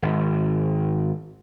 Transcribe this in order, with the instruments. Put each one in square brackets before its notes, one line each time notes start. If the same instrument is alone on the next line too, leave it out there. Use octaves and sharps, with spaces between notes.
[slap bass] G#1